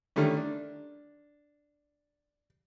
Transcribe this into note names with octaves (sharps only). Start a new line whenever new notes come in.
D3 D#3 G3 A3 C#4
D4